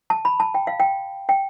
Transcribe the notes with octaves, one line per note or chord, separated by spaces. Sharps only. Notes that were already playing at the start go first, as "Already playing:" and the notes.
A5
B5
A5
G5
F5
G5
G5